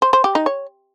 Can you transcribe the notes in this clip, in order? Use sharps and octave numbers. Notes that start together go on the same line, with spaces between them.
C5
C5
G4
D#4
C#5